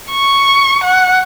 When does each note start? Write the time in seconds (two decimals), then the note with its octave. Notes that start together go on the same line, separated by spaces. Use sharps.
0.11 C#6
0.84 F#5